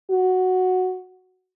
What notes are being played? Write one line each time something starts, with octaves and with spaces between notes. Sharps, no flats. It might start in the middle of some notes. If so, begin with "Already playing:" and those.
F#4